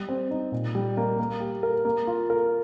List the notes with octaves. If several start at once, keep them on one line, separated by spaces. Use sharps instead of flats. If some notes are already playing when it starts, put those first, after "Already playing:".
Already playing: G3
C4
D#4
A#2
G3
A#3
A#3
G4
A#4
A#3
F4
A#4